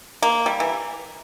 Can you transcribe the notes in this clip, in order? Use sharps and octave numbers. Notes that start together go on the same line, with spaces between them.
A#3
G3
E3